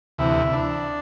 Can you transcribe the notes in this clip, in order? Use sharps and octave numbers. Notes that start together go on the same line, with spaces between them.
D2 C3 E3 E4
D4